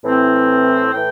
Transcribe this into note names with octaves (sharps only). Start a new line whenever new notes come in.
A2 E3 C4
A2 E3 G5